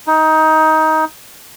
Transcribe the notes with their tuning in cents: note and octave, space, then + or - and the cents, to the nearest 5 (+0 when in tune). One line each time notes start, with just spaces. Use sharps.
D#4 +20